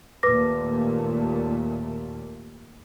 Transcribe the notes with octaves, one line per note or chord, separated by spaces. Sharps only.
D#2 A#2 A3 B4 D6 A#6